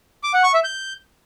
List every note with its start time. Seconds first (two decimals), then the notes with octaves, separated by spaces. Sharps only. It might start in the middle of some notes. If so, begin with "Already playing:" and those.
0.23 D6
0.34 F#5
0.44 C#6
0.54 E5
0.64 G6